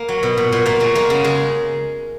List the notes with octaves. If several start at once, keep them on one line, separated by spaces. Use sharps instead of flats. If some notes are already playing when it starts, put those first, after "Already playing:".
Already playing: A#3
F#3
B2
A#2
A#2
A#2 A#3
F#3 G#3
G#3 A#3
C#3
G#3